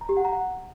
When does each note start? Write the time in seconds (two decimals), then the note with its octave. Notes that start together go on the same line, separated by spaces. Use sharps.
0.01 A#5
0.09 G4
0.17 F#5
0.25 A#5
0.33 F#5